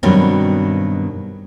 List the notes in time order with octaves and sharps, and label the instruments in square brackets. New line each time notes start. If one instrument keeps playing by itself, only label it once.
[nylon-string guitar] G2 B2 D#3 F#3 G3 C4